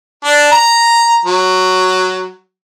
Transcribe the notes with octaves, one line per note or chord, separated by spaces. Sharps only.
D4
A#5
F#3